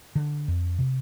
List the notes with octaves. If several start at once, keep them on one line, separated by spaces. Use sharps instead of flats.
D3
F2
C3